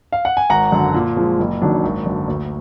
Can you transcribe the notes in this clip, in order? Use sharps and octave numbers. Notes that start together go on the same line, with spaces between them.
F5
F#5
G#5
G#1 F#5 A#5
F#2 D3
A#2
F3 G#3
F#1
F#2 D#3 F#3 D4
G#1
F#2 D3
D2